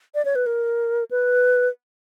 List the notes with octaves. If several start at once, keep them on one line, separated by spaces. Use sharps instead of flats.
D5
C#5
B4
A#4
B4